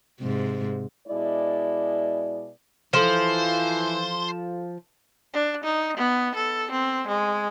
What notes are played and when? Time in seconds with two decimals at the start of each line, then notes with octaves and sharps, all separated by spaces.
0.21 G#2 C3
1.08 B2 G#3 E4 D5
2.94 E3 F3 A4 C5 C6 E7
5.33 D4
5.64 D#4
5.97 B3
6.35 A4
6.71 C4
7.07 G#3